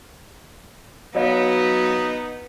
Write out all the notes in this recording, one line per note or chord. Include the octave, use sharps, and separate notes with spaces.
F#3 B3 D#4 C#5 D#5 F5